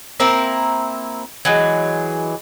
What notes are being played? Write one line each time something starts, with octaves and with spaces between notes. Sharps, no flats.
A#3 C4 E4 A#4
E3 F#3 G#3